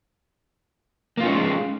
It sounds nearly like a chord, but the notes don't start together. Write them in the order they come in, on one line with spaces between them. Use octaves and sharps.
A#3 F4 C#4 D#4 G#3